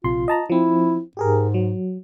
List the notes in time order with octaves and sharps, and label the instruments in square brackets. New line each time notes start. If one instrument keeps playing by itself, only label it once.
[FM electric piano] A#1 C3 C6 [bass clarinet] F4
[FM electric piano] D#5 A5 A#5
[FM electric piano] F3 C4 [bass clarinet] E4
[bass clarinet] G#2 [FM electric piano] G4 G#4 A#4
[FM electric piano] F#3